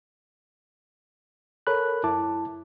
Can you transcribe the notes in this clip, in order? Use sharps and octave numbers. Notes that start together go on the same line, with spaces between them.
A4 A#4 C#5 B5 F#6
F#2 E4 A5 D6